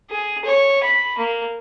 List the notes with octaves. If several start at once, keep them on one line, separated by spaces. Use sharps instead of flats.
G#4
C#5
B5
A#3